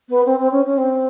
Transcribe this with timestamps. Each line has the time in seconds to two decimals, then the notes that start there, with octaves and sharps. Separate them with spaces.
0.08 B3
0.25 C4
0.38 C4
0.51 C#4
0.65 C#4
0.77 C4